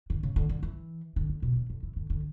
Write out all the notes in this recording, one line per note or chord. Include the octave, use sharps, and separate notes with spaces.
D3
C#3
D3
D3
E3
D3
D3
B2
C#3
D3
E3
D3
D3